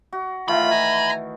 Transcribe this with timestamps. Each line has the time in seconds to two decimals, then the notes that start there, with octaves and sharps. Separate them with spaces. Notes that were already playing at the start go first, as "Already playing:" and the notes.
0.13 F#4
0.48 D#3 E3 A3 F4 B5
0.70 G#5 A#5